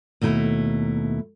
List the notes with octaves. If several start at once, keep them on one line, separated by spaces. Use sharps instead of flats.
D#2 B2 A3 E4 A#5